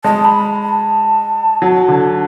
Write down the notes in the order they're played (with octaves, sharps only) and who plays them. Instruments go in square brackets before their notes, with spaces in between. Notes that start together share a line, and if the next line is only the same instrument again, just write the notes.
[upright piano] G#3 [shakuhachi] A5
[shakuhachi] B5
A5
[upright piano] F#3
D3